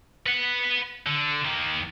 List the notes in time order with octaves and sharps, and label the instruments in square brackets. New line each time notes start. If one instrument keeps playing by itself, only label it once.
[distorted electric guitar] B4 F#5
D3
D#3 A#3